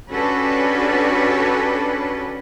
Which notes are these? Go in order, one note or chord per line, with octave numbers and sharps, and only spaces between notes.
C#4 D4 F#4 G4 A4 B4